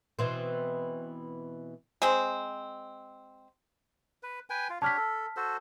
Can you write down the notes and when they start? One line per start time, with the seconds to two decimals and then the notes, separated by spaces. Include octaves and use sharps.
0.19 B2 E3 C4
2.02 G#3 C4
4.23 B4
4.50 B4 G5 G#5
4.70 F4
4.82 D4 G4 C#5 A5 F6 B6
4.97 A4
5.36 F#4 A4 C5